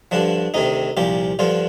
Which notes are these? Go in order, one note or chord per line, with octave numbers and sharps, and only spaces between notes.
G2 D3 F3 D4
D2 C3 D#3 D#4
C2 A#2 F3 G4
G2 D3 F3 F4